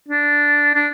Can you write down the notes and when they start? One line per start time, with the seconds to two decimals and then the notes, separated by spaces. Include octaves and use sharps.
0.09 D4
0.74 D4